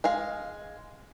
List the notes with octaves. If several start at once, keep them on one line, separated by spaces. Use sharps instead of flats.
G#3 G#4 F5